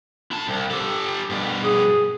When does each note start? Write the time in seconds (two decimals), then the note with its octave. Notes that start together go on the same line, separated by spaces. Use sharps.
0.31 E4 A5
0.48 C2
0.70 G4 A4
1.30 G2 B2
1.64 G#4